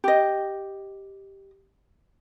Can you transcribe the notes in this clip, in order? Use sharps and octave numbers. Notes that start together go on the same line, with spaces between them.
G4 D#5